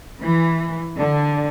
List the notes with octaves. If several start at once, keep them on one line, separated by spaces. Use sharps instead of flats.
E3
D3